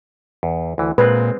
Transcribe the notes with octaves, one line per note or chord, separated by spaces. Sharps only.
E2
D2 E3
A#2 G#3 C4 B4